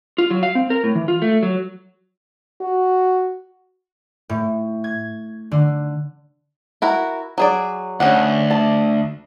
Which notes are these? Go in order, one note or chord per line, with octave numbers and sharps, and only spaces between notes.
F4
F#3
F5
C4
A#4
A2
E3
F4
A3
F#3
F#4
A2
G#6
D3
E4 F#4 A#4
F#3 G#4 D5
D2 C#4 G#4 F#5
A5